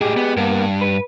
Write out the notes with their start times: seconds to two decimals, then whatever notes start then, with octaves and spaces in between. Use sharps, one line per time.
0.01 A2 G#3 G4 G#4
0.17 B3
0.37 G2 A#3 B3
0.81 B4